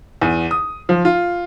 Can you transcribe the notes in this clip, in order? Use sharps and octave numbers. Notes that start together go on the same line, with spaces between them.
E2
D#6
F3
F4